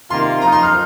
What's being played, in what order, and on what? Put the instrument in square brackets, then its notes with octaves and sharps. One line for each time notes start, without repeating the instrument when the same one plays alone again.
[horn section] C3 D#3 A#3 F4 [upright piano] C6
[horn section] F3 D#4 [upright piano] A#5
[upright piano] C6
F6